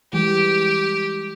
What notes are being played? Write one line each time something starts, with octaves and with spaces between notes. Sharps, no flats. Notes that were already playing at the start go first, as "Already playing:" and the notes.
E3 G3 G#3 G4